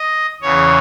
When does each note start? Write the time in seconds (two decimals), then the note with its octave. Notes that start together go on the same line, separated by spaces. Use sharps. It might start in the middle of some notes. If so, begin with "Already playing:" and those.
Already playing: D#5
0.42 E2 C#3 E3 C#5